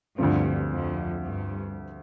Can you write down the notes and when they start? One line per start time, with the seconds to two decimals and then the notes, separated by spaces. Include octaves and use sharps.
0.18 D2 G2 D3 F3 C4
0.71 F2
1.22 G2